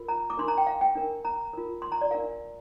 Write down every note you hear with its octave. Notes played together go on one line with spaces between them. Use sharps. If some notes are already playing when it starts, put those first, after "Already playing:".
Already playing: F4 A#4
A#5
D6
D4 A#4 C6
A#5
G5
F5
G5
D4 A#4
A#5
F4 A#4
C6
A#5
D5
D4 A#4 F5